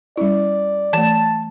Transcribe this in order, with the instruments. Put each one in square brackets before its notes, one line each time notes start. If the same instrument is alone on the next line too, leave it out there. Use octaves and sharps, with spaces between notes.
[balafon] G3 C#4 E4 [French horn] D5
[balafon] E3 A3 [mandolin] A5